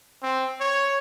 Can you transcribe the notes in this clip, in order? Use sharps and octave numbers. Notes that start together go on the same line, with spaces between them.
C4
C#5